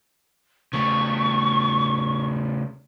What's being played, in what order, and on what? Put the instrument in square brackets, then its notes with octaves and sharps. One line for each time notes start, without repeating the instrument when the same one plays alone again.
[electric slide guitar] C#3 A3 [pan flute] C#6